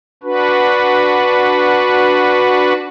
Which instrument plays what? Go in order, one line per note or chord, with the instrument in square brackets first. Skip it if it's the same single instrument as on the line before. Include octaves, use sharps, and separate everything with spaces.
[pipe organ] D4 F#4 B4